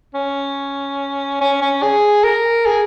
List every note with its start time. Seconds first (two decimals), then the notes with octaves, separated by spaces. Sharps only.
0.14 C#4
1.41 C#4
1.62 C#4
1.82 G#4
2.24 A#4
2.66 G#4